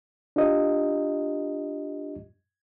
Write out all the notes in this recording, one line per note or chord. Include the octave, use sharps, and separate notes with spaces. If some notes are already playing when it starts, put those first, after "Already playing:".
D4 F4 G4 D#5